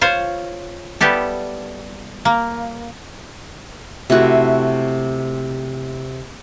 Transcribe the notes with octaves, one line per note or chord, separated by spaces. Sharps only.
F4 C5 C#5
G3 B3 E4 G4 A4
A#3
C3 A3 E4 F#4